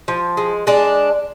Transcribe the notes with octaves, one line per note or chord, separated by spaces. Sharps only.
F3
G#3
G#3 D4 D5